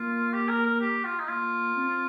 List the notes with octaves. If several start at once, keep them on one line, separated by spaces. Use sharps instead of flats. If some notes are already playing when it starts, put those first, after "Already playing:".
Already playing: A#3 F4
G4
A#4
A#4
G4
F4
D#4
A#3 F4
C4